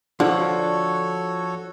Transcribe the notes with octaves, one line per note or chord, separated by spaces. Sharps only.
D3 F3 D4 F#4 A4 C#5